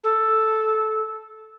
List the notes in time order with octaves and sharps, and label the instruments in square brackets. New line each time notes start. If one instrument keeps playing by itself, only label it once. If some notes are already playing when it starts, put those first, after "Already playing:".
[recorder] A4